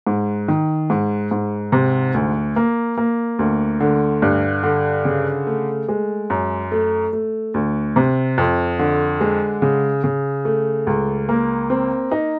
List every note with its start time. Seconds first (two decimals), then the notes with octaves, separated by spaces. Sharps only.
0.07 G#2
0.48 D#3
0.90 G#2
1.31 G#2
1.72 C3
2.14 D2
2.56 A#3
2.97 A#3
3.39 D2
3.80 D3
4.22 G2
4.63 D3
5.05 C#3
5.47 A3
5.88 G#3
6.30 F#2
6.72 A3
7.13 A3
7.54 D2
7.96 C3
8.38 F2
8.79 D3
9.21 G#3
9.62 C#3
10.04 C#3
10.45 A3
10.87 C#2
11.29 A#3
11.70 C4
12.12 D#4